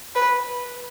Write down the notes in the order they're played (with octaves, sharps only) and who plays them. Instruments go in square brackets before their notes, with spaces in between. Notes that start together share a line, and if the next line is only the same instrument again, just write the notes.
[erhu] B4